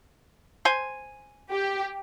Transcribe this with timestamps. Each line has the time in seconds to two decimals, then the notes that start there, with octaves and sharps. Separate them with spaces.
0.65 C5 G#5
1.51 G4